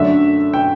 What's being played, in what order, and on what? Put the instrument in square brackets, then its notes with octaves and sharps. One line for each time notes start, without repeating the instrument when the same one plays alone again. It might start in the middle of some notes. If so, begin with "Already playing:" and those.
Already playing: [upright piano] F#2 D3 A3 D4 E5
G5